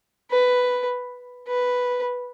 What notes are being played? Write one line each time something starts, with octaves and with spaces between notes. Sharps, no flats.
B4
B4